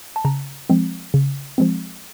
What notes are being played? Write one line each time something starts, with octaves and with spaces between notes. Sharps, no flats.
A5
C#3 A#5
F3 G#3 C4
C#3
F3 G#3 C4